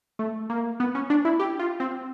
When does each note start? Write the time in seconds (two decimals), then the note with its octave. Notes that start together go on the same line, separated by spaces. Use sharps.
0.19 A3
0.50 A#3
0.80 B3
0.95 C#4
1.10 D4
1.25 E4
1.40 G4
1.59 F4
1.80 C4